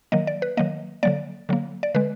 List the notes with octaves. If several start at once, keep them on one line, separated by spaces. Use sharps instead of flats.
D#3 F#3 A#3 D#5
D5
B4
D#3 F#3 A#3 D#5
D3 F#3 A#3 D5
D3 F#3 A#3
D5
D3 G#3 B4